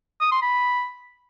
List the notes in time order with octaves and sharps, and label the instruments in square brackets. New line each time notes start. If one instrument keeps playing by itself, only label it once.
[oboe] D#6
C6
B5